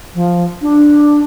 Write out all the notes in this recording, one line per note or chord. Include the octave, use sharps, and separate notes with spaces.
F3
D4